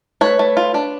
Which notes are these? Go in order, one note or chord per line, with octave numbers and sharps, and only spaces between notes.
A3 B4 C#5
A3
F4
D4